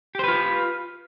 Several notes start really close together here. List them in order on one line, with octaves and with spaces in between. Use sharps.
G4 C5 B4 F4